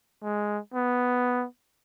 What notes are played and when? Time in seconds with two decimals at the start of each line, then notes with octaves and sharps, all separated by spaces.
0.23 G#3
0.74 B3